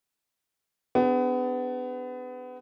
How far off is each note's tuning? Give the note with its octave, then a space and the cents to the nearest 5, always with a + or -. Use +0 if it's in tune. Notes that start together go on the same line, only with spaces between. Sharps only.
B3 +30 D4 +0 G#4 -10